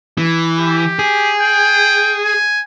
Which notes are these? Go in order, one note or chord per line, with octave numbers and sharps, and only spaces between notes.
E3
G4
G#4
G5
G#5